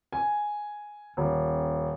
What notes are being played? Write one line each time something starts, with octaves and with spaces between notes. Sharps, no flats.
G#5
D#1